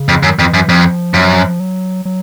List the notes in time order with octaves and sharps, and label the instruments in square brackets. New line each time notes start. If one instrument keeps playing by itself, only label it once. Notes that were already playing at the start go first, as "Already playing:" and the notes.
Already playing: [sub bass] C#3
[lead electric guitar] F2
[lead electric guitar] F#2 [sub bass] D#3
[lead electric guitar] F2 [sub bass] D#3
[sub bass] E3
[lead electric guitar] F#2
[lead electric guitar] F2 [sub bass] F3
[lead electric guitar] F#2
[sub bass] F#3
F#3